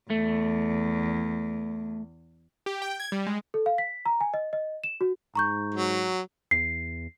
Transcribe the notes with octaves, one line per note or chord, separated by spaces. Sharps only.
E2 A3
G4
G5
G#6
G3
G#3
A4
F5
B6
A#5
G#5
D#5
D#5
E7
F#4
G#2 A#5 C#6 G6
F#3
E2 C7